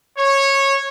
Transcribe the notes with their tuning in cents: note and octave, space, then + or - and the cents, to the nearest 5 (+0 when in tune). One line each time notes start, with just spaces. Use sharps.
C#5 -15